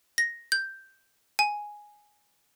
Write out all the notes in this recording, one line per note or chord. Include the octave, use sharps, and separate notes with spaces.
A#6
G6
G#5